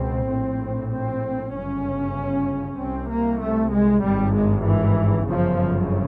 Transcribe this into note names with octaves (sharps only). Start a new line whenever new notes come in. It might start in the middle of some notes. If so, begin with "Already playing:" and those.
Already playing: C#2 B2 C4
A#1 A2
C4
G1 F#2 C#3 C#4
C2 C3 C4
A#3
A3
G#3
G#1 G2 G3
G#3
E3
G1 F#2 C#3 F3